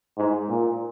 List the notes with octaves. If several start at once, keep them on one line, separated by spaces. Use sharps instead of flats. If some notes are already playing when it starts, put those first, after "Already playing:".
G#2
A#2